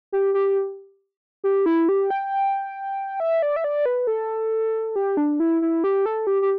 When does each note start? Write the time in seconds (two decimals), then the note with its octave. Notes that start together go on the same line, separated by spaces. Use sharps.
0.12 G4
0.34 G4
1.44 G4
1.66 E4
1.89 G4
2.10 G5
3.20 E5
3.42 D5
3.56 E5
3.64 D5
3.86 B4
4.07 A4
4.96 G4
5.17 D4
5.40 E4
5.62 E4
5.84 G4
6.06 A4
6.27 G4
6.42 G4